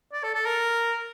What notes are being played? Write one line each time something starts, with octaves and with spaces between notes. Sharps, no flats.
D5
A4
A4
A#4